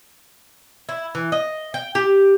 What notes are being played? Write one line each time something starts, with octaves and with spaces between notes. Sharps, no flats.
E4
E3
D#5
G5
G4